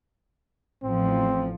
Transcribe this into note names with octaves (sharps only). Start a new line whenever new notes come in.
A1 F3 C4